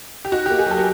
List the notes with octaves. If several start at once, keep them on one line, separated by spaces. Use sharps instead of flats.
G4
D#4 F#4
G4
A#3
G#4
F#3 A4
A#4